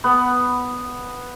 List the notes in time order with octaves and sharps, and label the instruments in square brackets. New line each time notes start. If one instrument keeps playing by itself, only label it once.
[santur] B3